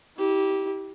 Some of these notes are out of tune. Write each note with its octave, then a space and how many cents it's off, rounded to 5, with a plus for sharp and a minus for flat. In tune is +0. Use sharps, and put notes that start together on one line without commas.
E4 -40 G4 -10